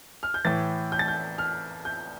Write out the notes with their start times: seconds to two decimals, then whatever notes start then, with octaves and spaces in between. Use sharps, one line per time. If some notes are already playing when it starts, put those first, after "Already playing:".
0.23 F6
0.34 G6
0.45 A2 E3 A6
0.92 G6
0.99 A6
1.08 G6
1.38 F6
1.85 G6